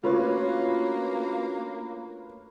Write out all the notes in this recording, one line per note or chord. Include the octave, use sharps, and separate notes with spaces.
A3 A#3 C#4 D4 F4 F#4 B4 C#5